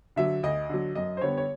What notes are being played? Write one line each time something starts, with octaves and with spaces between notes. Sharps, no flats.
D3 F#3 E5
D2 D#5
D3 F#3
F#2 D#5
C5
D3 G3 B3 C#5
C#5